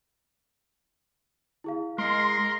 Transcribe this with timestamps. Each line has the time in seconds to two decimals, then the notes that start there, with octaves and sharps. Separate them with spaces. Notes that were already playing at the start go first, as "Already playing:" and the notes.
1.64 E4 G#4 F5
1.98 G#3 A#4 C6